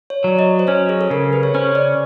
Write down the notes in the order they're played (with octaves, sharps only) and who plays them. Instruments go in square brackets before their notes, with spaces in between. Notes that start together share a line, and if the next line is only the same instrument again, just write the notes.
[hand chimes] C#5
[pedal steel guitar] F#3 [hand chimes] D5
[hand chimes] D#5
C5
[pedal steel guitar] C#4 [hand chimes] C#5
[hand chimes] G#4
A4
[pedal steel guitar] C#3 [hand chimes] A#4
[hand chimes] B4
C#5
[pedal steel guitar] C#4 [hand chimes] C5
[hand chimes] D5